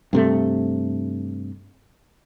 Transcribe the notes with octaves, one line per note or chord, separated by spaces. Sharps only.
G2 C3 A3